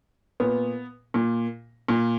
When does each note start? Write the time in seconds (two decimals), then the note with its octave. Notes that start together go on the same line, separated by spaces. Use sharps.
0.40 A#2 B3
1.14 A#2
1.88 A#2